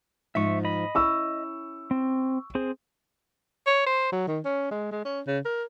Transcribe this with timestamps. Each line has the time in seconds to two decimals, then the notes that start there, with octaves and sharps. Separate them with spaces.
0.35 G#2 F3 D#4 E5 C#6
0.65 D#5 B5
0.95 C#4 E4 C#6 E6
1.91 C4
2.55 C4 G#4 C5
3.67 C#5
3.86 C5
4.12 F#3
4.28 D#3
4.45 C#4
4.71 G#3
4.92 G#3
5.05 C#4
5.27 C#3
5.45 A#4